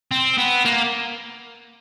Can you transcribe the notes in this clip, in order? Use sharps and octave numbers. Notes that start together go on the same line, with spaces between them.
C4
B3
A#3